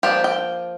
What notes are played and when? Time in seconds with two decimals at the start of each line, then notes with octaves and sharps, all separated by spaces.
0.03 F3 A#3 D4 F4 G4
0.24 G5